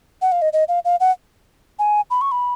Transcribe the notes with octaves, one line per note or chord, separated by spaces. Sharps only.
F#5
F5
D#5
D#5
F5
F5
F#5
G#5
B5
C#6
B5